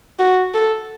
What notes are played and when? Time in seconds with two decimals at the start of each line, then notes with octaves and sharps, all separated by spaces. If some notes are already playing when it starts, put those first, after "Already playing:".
0.19 F#4
0.54 A4